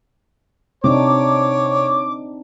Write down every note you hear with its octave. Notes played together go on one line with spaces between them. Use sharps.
C3 C4 D4 D#4 C#5 D6